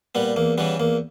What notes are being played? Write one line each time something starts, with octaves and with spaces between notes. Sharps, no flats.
A#2 G3 B3
E2 A#3
C#3 E3 G3 B3
E2 A#3